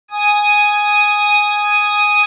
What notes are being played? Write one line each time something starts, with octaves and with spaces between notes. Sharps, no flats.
G#5 D#6